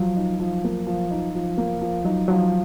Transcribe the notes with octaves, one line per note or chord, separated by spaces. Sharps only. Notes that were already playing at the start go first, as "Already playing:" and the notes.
Already playing: F3 F#3
D#4
F3
A#3
F3
D#4
F3
A#3
F3
F#3 D#4
F3 F#3